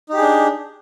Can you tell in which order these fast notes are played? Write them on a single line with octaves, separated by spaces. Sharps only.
D#4 G4 G#4 D4